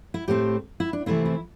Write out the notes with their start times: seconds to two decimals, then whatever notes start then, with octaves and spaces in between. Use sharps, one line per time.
0.14 E4
0.28 A2 A3 C4 G4
0.80 E4
0.93 D4
1.06 C3 E3 A3 C4 E4
1.26 E4